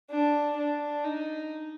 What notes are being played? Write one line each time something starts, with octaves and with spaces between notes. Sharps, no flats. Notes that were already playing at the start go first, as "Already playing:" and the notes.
D4
D4
D#4